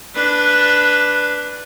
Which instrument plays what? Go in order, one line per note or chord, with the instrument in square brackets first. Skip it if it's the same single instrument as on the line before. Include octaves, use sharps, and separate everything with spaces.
[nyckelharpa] D4 B4